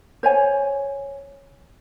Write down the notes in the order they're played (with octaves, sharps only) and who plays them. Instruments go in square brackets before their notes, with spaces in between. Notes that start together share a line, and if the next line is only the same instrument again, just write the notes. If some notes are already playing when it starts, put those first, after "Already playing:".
[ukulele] C5 C#5 G#5